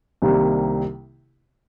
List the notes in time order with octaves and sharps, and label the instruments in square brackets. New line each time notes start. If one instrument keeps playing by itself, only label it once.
[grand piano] C2 C3 D#3 G3 A#3